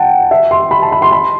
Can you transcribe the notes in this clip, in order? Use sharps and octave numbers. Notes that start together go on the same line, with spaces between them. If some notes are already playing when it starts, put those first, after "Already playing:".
Already playing: F#5 G5 A5
E5
C6
B5
A5
B5
C6
B5